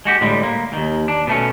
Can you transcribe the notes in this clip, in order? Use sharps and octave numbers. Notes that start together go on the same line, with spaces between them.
G#3 F#4 G4
A2 D3 G3 G#3
A#3
D#2 D#3
D4
B2 A3 C#4